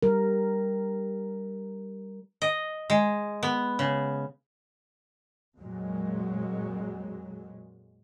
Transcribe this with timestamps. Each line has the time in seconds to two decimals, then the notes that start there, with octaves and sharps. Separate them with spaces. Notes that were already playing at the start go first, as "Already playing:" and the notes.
0.03 G3 A#4
2.42 D#5
2.90 G#3
3.43 B3
3.79 C#3
5.58 F2 A#2 F#3 G#3